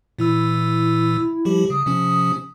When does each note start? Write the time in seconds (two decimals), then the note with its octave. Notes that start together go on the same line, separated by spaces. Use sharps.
0.19 A#2 E3 E4 E6
1.45 F3 G3 G4
1.70 C#3 D#6
1.86 C3 F3 C#4